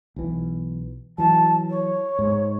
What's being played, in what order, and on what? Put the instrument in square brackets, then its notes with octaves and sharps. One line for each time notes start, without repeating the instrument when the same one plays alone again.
[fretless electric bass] B1 E3
[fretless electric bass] E3 F#3 [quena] A5
[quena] C#5
[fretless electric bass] G#2